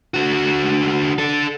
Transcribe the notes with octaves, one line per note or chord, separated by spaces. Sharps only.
D3 F#4
D4 A4